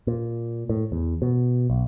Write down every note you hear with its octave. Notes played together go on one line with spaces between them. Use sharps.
A#2
A2
E2
B2
B1